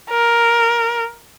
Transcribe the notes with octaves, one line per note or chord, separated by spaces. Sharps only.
A#4